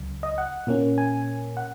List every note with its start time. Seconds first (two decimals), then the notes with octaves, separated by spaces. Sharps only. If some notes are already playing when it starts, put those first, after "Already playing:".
Already playing: C#2 C#3 F#3
0.23 D#5
0.38 F#5
0.67 A#2 A#3 C#4
0.98 G#5
1.57 F#5